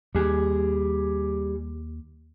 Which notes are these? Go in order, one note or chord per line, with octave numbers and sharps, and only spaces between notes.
D#2 G3 G#4